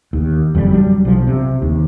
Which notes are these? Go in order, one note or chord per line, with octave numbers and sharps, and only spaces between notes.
D#2
F#1 F2 B2 G3
F#3 G3 D4
B1 F3
C3
D#2